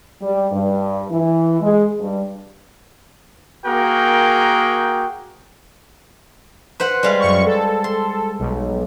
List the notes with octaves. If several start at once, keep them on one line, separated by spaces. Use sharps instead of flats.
G3
G2
E3
G#3
G2
A#3 F#4 G#4 A#4 G5
B4 C5 F#5
G3 G#3 F5
F#2 C#6
A4
C6
B1